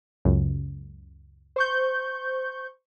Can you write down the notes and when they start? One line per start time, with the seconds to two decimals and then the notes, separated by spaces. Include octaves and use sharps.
0.25 C#2 F#2
1.56 C5 C#6 G6